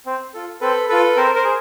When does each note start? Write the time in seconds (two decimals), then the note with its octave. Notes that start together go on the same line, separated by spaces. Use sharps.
0.06 C4
0.34 F4 A4
0.61 C4 A4 B4
0.89 F4 A4 B4
1.16 C4 A#4 C5
1.35 A#4 C5
1.44 G#4